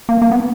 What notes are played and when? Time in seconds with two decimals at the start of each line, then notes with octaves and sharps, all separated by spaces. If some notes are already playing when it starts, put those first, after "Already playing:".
0.09 A#3
0.22 A#3
0.31 B3